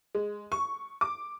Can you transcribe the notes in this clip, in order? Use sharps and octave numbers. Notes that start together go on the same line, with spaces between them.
G#3
C#6
D6